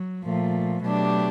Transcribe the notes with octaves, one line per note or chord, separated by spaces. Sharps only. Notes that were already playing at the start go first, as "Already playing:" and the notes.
Already playing: F#3
A#2 F3 A3
B2 F#3 A3 D4 G4